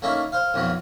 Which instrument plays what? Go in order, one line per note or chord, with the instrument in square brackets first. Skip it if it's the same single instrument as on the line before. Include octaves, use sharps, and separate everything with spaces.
[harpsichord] A3 A#3 C#4 D#4 E4
C5 F5
B1 F2 F3 A3